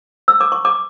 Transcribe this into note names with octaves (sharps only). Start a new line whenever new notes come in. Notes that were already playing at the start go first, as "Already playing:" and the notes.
E6
D6
C#6
D6